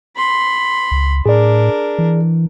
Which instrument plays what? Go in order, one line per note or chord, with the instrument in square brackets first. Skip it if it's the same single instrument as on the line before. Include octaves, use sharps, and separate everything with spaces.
[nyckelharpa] B5 C6
[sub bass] C#2
[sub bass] A2 [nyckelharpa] D4 A#4 [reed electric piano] G#4 D5
[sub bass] E3